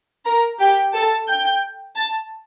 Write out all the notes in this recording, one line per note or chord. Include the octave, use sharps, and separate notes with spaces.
A#4 A#5
G4 G5
A4 A5
G5 G6
A5 A6